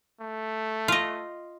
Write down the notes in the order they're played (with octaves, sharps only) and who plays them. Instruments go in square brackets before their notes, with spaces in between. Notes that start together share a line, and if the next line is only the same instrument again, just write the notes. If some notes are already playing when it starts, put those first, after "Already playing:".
[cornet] A3
[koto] F4 D#5